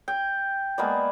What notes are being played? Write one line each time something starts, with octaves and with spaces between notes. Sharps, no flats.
G5
G#3 A#3 B3 D5